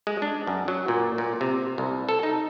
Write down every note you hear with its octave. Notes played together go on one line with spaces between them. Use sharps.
G#3
D4
F#2
F#3
A#2
A#2
C3
C2
A4
D#4